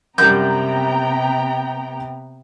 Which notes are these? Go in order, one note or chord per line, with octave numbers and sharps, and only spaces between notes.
F#2 C3 G3 B3 G5 A#5 G6